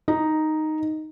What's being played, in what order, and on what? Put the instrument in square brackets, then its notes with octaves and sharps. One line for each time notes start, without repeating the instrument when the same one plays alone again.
[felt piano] D#4